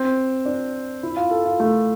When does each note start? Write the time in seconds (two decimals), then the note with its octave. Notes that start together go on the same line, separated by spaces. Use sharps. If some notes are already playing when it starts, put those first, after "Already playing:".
Already playing: C4
0.46 D4
1.03 E4
1.17 F4
1.31 A4
1.45 F4
1.60 A3